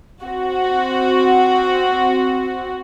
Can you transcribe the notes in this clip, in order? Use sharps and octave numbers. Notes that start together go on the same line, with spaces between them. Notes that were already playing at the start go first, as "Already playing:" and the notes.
C4 F#4